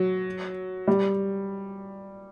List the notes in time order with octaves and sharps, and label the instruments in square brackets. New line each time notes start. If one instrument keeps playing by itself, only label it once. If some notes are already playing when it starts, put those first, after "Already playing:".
Already playing: [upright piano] F#3
G3